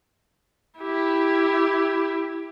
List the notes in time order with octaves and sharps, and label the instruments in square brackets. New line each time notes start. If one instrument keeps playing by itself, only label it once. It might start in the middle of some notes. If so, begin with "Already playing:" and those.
[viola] E4 G4